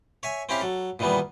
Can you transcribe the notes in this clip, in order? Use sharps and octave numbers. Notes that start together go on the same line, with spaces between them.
C#5 E5 G#5
C4 C#4 E4 G4 E5 F5
F#3 A4
A#2 D#3 E3 G3 B3